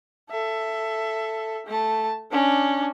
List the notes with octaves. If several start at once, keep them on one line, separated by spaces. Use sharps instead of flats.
A4 E5
A3 A5
C#4 D4